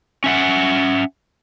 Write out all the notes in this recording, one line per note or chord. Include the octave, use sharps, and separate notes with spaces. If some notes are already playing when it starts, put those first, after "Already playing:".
C#4 E5 F#5